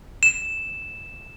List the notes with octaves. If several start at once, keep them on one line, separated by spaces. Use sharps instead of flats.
E7